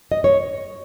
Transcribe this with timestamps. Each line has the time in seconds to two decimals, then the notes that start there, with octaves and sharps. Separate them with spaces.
0.12 D#5
0.24 C#5